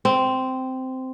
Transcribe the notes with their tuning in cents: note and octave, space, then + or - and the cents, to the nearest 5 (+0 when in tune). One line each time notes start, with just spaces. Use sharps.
C4 -10